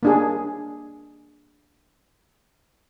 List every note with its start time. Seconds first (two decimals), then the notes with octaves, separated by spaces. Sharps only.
0.03 A#3 D4 G#4